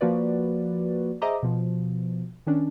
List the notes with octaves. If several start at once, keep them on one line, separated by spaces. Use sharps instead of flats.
F3 A#3 F#4 B4 D5
G#4 C5 D#5 E5 A#5 D6
B2 F3
D#3 C#4 D4